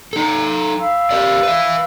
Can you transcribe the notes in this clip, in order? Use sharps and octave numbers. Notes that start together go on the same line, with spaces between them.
D#4 A4
F5 B5 E6
G4 A#4 D5
B4 E5